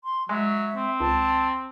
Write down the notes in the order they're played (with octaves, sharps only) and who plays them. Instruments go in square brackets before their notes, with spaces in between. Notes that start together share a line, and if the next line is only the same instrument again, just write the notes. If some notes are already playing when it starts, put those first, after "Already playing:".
[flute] C6
[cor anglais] F#3 [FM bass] G#3 [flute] E5
[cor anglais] C4
[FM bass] C#2 [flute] A5